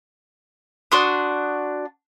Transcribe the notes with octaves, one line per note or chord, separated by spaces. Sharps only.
D4 F#4 C6 D#6